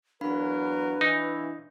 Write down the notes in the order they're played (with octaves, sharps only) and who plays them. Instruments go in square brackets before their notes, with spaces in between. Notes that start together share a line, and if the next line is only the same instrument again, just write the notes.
[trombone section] E2 F#3 A#4 [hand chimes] D4 F5 B5 [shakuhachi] B4
[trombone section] E3 [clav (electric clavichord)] D#4